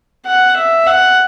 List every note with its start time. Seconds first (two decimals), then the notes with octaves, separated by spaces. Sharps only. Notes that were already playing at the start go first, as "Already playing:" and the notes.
0.26 F#5
0.56 E5
0.86 F#5